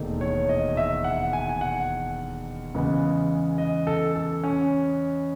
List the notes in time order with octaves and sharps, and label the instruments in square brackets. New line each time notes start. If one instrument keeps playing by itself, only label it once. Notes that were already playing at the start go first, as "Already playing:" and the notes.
Already playing: [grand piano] E1 D#2 D#3 A3
C#5
D#5
E5
F#5
G#5
G#5
F#5
E2 C#3 G#3 B3
D#5
A4
A4
C#4